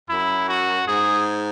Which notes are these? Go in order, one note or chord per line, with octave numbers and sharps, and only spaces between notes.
F#2 E4
F#4
G#2 G#4